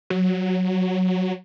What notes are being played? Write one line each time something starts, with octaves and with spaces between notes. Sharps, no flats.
F#3